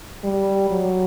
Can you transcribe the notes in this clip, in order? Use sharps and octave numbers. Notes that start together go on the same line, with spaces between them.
G3
F#3